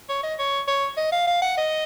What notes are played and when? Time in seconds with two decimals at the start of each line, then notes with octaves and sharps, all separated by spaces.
0.09 C#5
0.24 D#5
0.39 C#5
0.68 C#5
0.97 D#5
1.12 F5
1.28 F5
1.42 F#5
1.58 D#5